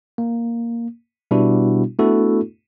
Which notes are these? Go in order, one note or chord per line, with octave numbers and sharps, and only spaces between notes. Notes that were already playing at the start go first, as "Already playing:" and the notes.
A#3
B2 G3 B3 D4 E4 F#4
A3 B3 D4 E4 F#4 A4